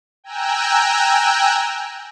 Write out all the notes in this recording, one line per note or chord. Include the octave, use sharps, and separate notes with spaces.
G5 G#5 A#5 E6 F#6